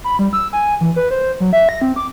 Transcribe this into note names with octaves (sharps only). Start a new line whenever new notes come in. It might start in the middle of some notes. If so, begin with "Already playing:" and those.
B5
G3
E6
G#5
E3
B4
C5
F#3
E5
A#6
C4
D6